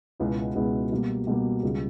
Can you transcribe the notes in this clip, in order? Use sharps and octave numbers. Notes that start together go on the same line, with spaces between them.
C#2 B2 G#3 B3 E4
C#2 B2 G#3 B3 E4
B2 G3 A#3
B2 G3 A#3
C#2 C#3 G3